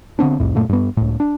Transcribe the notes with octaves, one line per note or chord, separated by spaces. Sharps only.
D3 B3 C4 D4
C2 F2 A2
F#2 A#2 A3
G2 B3
C#2 A2
D4